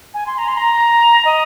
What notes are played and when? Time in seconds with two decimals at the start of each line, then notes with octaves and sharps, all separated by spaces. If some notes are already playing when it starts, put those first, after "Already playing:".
0.14 G#5
0.27 C6
0.38 A#5
0.48 C6
0.57 A#5
1.25 D#5